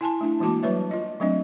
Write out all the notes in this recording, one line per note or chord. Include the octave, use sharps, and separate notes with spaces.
E4 G#5 A5 C6
A3 D4 E4
E3 G#3 A#3 F#4 A5 D6
F#3 G3 B4 C#5 E5
F4 D#5
F#3 A3 C4 D4 D#5